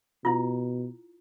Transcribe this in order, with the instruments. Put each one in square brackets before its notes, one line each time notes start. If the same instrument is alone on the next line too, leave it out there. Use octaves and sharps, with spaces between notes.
[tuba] B2 [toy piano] E4 F4